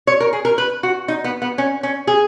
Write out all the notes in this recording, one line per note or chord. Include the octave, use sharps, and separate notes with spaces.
C#5
A#4
G#4
A#4
B4
F#4
D#4
B3
B3
C#4
C#4
G#4